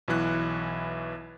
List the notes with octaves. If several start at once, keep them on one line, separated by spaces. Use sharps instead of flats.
B1 B2 E3 E4 F#6